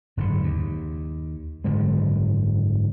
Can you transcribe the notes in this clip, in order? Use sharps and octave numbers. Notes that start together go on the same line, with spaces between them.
F#1 G#2 D3
D#2
F#1 G#2 D3 G#3